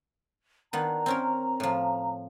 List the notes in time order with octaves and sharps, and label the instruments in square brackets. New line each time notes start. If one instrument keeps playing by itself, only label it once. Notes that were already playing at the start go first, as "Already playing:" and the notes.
[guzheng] D#3 B3 D4 [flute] A#5
[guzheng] C4 C#4 A#4
A2 F3